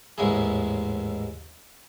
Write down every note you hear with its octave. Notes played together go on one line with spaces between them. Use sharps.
A1 D#2 G#2 G#3 E4 G#4